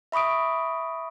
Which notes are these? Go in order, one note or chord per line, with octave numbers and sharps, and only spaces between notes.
E5 B5 C#6 D#6 D7